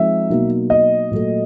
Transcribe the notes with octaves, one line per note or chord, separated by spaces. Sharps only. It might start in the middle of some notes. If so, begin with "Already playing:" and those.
Already playing: F3 G#3 C4 D#4 E5
B2 F#3 A#3 D#4
D#5
A#2 F#3 A3